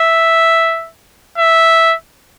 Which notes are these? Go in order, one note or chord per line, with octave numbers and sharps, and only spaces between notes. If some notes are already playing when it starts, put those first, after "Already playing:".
Already playing: E5
E5